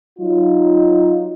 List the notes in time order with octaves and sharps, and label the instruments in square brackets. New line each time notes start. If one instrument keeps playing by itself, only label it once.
[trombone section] F#3 D#4 F4